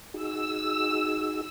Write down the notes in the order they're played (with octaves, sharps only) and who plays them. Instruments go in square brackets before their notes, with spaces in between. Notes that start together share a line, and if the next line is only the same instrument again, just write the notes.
[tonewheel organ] D#4 F#4 G#4 [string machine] E6